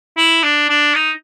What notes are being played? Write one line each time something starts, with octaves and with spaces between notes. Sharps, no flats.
E4
D4
D4
D#4